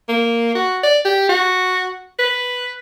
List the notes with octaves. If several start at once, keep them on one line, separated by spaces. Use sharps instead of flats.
A#3
F#4
D5
G4
F#4
B4